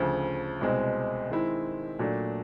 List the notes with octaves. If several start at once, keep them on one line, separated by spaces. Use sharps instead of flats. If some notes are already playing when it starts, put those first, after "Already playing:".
Already playing: D2 C#3 F3
C2 B2 G#3 C4
D#3 G#3 C4 E4
A#2 F#3 A3 D4